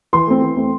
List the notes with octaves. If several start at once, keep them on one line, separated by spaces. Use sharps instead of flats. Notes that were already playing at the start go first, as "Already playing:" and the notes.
E3 C6
A3 C4
E3
A3 C4